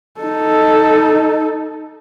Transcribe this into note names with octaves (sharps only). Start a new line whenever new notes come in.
D#4 A4